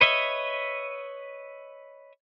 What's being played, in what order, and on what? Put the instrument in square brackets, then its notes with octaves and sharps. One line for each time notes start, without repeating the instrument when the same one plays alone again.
[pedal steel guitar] B4 C#5 D#5 E5